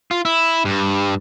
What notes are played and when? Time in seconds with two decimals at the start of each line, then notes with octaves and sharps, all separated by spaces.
0.11 F4
0.25 E4
0.65 G2